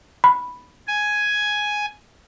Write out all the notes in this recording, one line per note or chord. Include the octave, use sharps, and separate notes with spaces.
B5
G#5